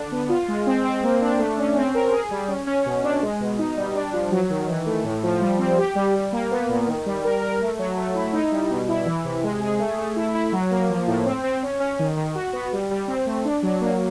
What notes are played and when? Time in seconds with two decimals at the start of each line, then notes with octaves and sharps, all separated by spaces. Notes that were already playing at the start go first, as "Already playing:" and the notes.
Already playing: D3 D4
0.12 B3
0.29 F4
0.48 G#3
0.67 C4
0.85 C4
1.03 A#3
1.21 D4
1.38 A3
1.58 C#4
1.76 C4
1.95 A#4
2.12 G#4
2.31 G3
2.48 C#4
2.67 C#4
2.86 B2
3.04 D4
3.22 G#3
3.40 B2
3.58 D#4
3.77 G3
3.95 D4
4.13 F3
4.32 F#3
4.50 D#3
4.67 E3
4.86 A3
5.04 A2
5.23 F3
5.41 G3
5.59 C4
5.78 G4
5.95 G3
6.14 G3
6.32 A#3
6.51 B3
6.69 A#2
6.88 D#3
7.06 G3
7.24 A#4
7.42 A#4
7.61 A3
7.79 F#3
7.97 A3
8.15 E4
8.33 D#4
8.51 G3
8.71 B2
8.88 E4
9.06 E3
9.24 C3
9.44 G#3
9.61 G#4
9.79 A3
9.98 A3
10.16 E4
10.35 E4
10.52 F#3
10.71 A#3
10.90 F3
11.07 A2
11.26 C4
11.44 C4
11.63 C#4
11.80 C#4
11.99 D#3
12.17 D#3
12.35 F#4
12.53 B3
12.73 G3
12.91 G3
13.08 C4
13.26 A3
13.45 D4
13.63 F#3
13.81 A#3